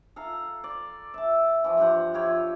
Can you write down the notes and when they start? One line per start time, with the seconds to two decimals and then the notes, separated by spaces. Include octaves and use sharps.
0.16 A4 F5 A#5
0.64 D5
1.14 E5 A5
1.64 E3 F3
1.77 G2 F3 G4 F#5
2.14 E4 F4 G4 C#5